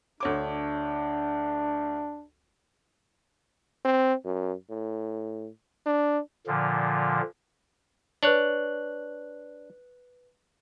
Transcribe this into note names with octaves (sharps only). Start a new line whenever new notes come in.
D2 D4 C#5 D6
C4
F#2
A2
D4
A#2 D3 F3
D4 B4 C#5 F#6 F#7